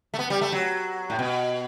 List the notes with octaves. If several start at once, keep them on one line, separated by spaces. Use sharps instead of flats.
A3
B3
G3
A3
F#3
A2
B2